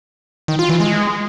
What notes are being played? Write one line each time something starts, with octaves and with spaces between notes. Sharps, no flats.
D#3
F4
E3
G#3